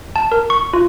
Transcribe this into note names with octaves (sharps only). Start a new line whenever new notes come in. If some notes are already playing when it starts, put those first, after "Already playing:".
A5
A#4
C#6
F4